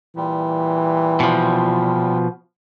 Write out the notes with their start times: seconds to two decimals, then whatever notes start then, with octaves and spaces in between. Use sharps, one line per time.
0.16 A#2 E3 G3
1.20 B2 F3